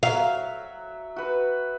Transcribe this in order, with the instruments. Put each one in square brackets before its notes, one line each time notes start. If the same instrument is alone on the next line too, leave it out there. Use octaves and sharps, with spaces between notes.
[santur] F#3 E5 [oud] F5
[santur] F#4 B4